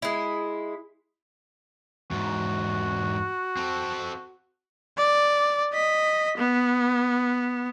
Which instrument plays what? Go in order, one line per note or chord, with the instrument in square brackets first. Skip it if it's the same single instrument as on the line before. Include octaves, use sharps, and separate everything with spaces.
[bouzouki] G#3 E4
[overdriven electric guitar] E2 G#2 [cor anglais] F#4
[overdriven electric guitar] C4 A4
[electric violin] D5
D#5 B6
B3